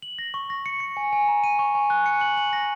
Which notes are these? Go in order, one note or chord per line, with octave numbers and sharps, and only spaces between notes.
F#7
A#6
C#6
A#6
C#7
C#7
G#5
G#5
A#5
D#7
C#6
G#5
F#6
C#7
F#7
F#7
A#6